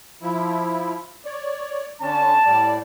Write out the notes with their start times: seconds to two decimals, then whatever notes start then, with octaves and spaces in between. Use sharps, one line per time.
0.22 F3 E4
1.25 C#5 D5
2.01 D3 C#4 D4 A5
2.46 A2 G3 D5